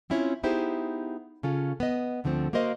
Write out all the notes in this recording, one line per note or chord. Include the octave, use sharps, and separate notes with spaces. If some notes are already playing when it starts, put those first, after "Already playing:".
C4 C#4 E4 F4 C#5
B3 D#4 E4 G4 G#4 C5
C#3 C#4 F4 A4
B3 D#5
D2 D3 F3 A3 C4
A#3 F#4 A#4 C5 D#5 F5